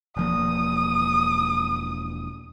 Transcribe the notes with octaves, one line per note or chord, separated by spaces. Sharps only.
E1 F3 A#3 D#6